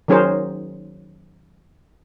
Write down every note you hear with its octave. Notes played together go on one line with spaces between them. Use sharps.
D#3 F#3 C#4 G#4 A#4 C5